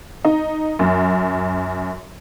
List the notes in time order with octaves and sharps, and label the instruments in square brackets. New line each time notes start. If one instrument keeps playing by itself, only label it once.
[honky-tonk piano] D#4
F#2